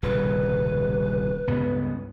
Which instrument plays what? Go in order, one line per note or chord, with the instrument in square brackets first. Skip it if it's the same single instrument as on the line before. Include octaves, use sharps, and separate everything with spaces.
[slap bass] D#1 C2 C#3 [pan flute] B4
[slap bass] C#2 G2 B3